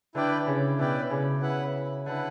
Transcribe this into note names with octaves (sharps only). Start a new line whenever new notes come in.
D3 E4 B4 D5 G5
C#3
B2 E4 B4 D5 G5
C#3
E4 B4 F#5
D3 E4 B4 F#5